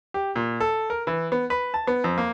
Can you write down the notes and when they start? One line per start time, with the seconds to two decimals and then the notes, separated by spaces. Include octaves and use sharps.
0.14 G4
0.36 A#2
0.60 A4
0.90 A#4
1.07 E3
1.32 B3
1.50 B4
1.74 A5
1.87 B3
2.04 F2
2.18 A#3